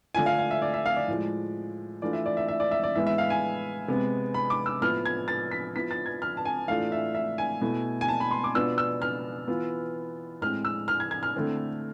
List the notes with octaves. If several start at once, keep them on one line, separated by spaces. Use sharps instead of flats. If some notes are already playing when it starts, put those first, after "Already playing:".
D3 A3 D4 F4 G#5
F5
F5
E5
D5
E5
F5
D5
A2 F3 G#3
E3 A3 D4 F4 D5
E5
D5
E5
E5
D5
E5
D5
A2 E3 G#3 B3 E5
E5
F5
G#5
C3 G#3 B3
B5
D6
E6
A2 F3 B3 E4 F6
G#6
A6
B6
F3 B3 E4 B6
A6
G#6
F6
A5
G#5
A2 E3 A3 D4 F4 F5
E5
E5
G#5
B2 A3 E4
G#5
A5
B5
C6
D6
B2 B3 D4 F4 E6
E6
F6
E3 B3 F4
A2 G#3 C4 F6
E6
F6
G#6
G#6
F6
D3 A3 C4 E4